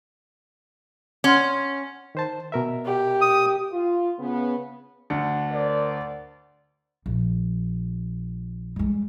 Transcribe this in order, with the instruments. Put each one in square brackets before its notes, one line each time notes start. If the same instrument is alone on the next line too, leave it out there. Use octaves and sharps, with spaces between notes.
[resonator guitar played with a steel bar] C#4 [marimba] F#5 C6 F6
[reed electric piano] D#3 C5 A5
B2 A#4 E5
[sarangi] G4
[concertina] D#6
[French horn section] F4
C#3 B3
[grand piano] D2 D4 C#7
[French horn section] A#4 C5 D5
[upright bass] A#1
G3 G#3